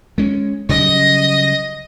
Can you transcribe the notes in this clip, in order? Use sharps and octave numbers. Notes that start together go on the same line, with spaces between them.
G#3 C#4
C#3 F#3 G3 D#5